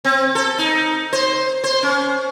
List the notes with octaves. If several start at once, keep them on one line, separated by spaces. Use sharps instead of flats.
C4
A4
D#4
C5
C5
C#4